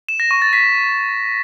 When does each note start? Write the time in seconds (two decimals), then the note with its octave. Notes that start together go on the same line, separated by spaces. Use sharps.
0.09 E7
0.20 A#6
0.31 C#6
0.42 A6
0.53 B6